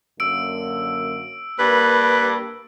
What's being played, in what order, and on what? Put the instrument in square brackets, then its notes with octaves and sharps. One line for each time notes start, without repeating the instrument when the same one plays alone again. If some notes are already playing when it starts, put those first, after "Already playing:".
[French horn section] F#2 D3 A#3 [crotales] E6 D7
[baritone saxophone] G2 [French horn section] A#3 [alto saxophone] B4